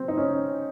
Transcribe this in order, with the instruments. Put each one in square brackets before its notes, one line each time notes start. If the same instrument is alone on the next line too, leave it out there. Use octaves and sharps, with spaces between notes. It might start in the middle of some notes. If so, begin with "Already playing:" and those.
Already playing: [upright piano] F#3 C4
D#4
C#4